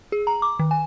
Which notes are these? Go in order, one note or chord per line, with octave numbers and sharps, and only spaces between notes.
G#4
A#5
D6
D#3
G#5